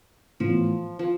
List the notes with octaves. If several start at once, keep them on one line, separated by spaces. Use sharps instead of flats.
A2 E3 F3 B3
F3